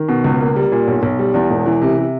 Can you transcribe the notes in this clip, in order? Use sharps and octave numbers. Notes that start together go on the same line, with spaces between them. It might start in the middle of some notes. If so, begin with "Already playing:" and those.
Already playing: D#3
B2
C#2
A#3
G3
A#2
B1
B1
G3
E2
E1
E3
C3
C3